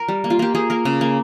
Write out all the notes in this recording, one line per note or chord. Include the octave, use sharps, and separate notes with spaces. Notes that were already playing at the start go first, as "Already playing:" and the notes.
Already playing: A#4
G3
A#3
F4
A#3 G4
A#3 G#4
A#3 A#4
C#3
A#3